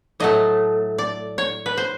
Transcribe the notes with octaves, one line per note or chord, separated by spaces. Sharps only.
A2 F#3 A3 D#5
D5
C#5
B4
C5